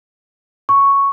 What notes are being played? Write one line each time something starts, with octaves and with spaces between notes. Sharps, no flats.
C#6